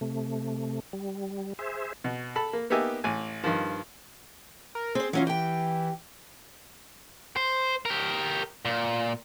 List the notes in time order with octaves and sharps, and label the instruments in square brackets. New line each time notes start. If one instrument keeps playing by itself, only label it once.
[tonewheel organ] C3 A3
G3
G#4 C5 E5
[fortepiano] B2
A4 A5 B5
A#3
A#3 B3 D#4 G4 E5 G#5
A1 G#5
G2 D#3 F3
[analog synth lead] A#4
[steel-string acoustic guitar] C4 C5 [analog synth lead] G#4
[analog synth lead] E3 [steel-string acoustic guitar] F#3 C#4 F4
[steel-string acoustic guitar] G4 G5
[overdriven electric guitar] C5
G4 A#4
A#2